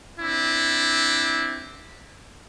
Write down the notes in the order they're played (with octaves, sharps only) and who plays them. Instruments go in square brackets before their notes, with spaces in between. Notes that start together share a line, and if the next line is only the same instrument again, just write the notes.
[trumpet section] C4 D4 E4